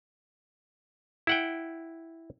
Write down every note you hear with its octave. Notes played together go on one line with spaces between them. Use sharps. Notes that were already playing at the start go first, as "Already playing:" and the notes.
E4 F#5 G5